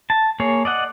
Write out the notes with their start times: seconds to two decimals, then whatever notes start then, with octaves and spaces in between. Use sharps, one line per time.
0.10 A5
0.40 A#3 G#4 C#5
0.65 D5 D#5 F#5